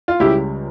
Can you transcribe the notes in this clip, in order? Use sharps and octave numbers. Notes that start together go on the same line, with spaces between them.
F4
C#2 C#3 G3 E4 G4